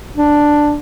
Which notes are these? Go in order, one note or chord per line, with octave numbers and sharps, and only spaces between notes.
D4